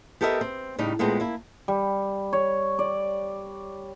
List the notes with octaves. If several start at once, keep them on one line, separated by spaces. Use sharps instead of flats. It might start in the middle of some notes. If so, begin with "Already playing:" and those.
B3 G4 A4 A#4 D#5 E5
C4
A2 C#3 G3 D#4
A#2 G#3 A3 B3 C4
A#3 E4
G3
C#5
D5